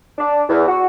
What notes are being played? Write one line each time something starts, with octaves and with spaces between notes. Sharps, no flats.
D4
E2
F#4